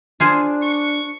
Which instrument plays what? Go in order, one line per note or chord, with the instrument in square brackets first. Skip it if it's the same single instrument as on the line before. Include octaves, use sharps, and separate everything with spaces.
[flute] D4 [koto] F4 G#4 C5
[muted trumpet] C#6